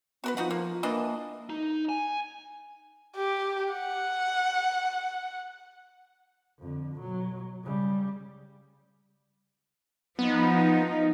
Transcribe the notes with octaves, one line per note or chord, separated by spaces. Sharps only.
B3 F#4 A#4 B4
F3 D#4 F#4 F#5
A#3
E3 A#3 D4 D#5
D#4
G#5
G4
F#5
F2 D3
B2 F#3
C#3 G3
F3 B3 D#4